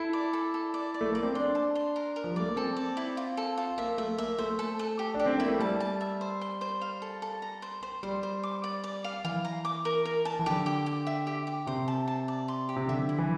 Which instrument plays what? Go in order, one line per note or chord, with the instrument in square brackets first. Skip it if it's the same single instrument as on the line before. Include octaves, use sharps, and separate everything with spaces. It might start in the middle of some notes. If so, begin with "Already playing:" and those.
Already playing: [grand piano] E4 [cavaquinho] A4
[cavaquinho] D5
A4
A4
D5
D5
[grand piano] A3
[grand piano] A#3 [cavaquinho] D5
[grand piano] C4
[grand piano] D4 [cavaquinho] C6
[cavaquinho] A5
C6
A#4
A#4
[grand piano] F3
G3
[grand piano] A3 [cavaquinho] D5
[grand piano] A#3
[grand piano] C4 [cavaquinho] A4
[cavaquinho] D5
E4
F4
A4
F4
[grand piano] A#3 [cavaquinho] E5
[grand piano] A3 [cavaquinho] E5
[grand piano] A#3 [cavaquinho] E5
[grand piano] A3 [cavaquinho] C5
[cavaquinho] A4
A4
G4
[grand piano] D4 [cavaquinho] G4
[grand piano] C4
[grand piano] A#3 [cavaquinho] E4
[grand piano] A3
[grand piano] G3 [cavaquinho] A5
[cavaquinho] A5
E5
C5
C6
C5
F5
A4
A4
A#5
C5
C5
[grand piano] G3 [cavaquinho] C5
[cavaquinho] C5
D6
D5
D5
F5
[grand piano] E3 [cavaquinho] F5
[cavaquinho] A#5
D6
A#4
A#4
A5
[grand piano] E3
[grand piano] D3 [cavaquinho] G4
[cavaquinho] G4
G4
E5
G4
G4
[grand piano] C3 [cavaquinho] C5
[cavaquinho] A5
A5
D5
C6
G4
[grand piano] C3
[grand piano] D3 [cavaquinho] E5
[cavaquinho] E4
[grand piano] E3